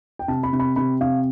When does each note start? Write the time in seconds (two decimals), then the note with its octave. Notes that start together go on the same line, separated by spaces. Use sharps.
0.19 G5
0.28 C3 A5
0.43 B5
0.53 C3
0.59 B5
0.76 C3 B5
1.00 C3 F5